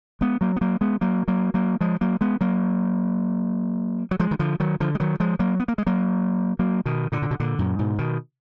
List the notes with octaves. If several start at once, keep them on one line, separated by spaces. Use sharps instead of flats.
G#3 B3
F#3 A#3
B3
F#3 A#3
G#3 B3
F#3 A#3
F#3 A#3
F#3 A#3
F3 G#3
F#3 A#3
G#3 B3
F#3 A#3
F#3
F3 G#3
D#3
D3 F3
D#3 F#3
D3 F3
G#3
D#3 F#3
F3 G#3
F#3 A#3
B3
A#3
G#3
F#3 A#3
F#3 A#3
B2 D#3
A#2 D3
A#2
B2
A#2 D3
F#2 A#2
G#2 B2
B2 D#3